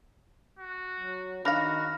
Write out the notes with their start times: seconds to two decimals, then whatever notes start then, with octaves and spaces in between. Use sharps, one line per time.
0.59 F#4
1.00 F#3
1.45 D#3 D4 F#4 F5 B5 F6 A#6